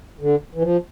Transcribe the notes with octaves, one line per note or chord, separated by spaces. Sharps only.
D3
E3
F3